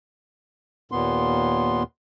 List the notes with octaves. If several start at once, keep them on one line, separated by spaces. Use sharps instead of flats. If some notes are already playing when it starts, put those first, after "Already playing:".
D#2 A#2 B3 C6